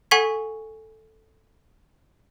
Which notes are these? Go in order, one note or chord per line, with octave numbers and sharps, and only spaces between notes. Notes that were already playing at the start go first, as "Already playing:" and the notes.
A4 F#5 G#5 C#6 G#6 B6